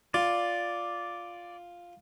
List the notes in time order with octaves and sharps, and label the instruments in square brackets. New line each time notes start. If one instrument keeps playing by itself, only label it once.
[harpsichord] F4 [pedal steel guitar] D5